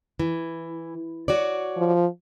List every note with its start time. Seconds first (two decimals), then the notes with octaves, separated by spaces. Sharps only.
0.19 E3
1.28 F#4 C#5 D5
1.77 F3